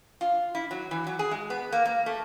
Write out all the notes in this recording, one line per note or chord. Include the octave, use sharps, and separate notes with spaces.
F4
E4
F#3
E3
F#3
G#4
G#3
B3
A#3
A#3
A3